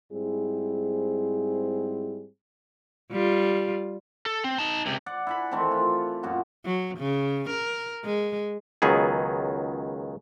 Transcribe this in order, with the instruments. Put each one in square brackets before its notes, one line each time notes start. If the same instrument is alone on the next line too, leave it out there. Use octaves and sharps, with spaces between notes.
[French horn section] G#2 G3 C4 E4 G#4
[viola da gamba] G3 F4
[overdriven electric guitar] A4
C4
D#4 A5
C#2 C3
[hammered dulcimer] D5 F#5
E4 G#5 B5
D#3 E3 A3 C4
F4
F#2 A#2 F#4
[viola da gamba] F#3
C#3
A#4
G#3
[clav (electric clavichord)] C#2 D#3 F#3 B3 G#4